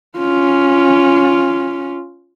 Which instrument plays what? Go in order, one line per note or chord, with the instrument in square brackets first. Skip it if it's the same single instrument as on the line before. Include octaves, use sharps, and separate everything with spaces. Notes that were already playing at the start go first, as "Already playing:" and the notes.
[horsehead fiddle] C#4 F4